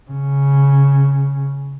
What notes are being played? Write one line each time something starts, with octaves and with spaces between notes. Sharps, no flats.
C#3